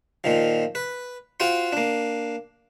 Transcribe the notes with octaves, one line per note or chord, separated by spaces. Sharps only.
A#2 D#3 F3
B4
F4 F#4 C5 G5 C6
A#3 D4